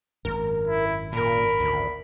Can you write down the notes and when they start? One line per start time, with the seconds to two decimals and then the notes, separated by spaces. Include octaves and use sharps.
0.25 G#1 F#2 A#4
0.68 E4
1.13 A#2 A#4 B5
1.60 D2